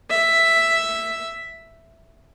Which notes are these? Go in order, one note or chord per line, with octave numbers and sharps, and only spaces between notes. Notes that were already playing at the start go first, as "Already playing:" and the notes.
E5